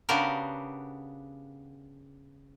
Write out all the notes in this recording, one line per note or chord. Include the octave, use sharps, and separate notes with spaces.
C#3 B3 D4 F#4 G4 A#4